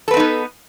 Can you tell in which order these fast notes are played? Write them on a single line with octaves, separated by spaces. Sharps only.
A4 B4 C4 D#4 B3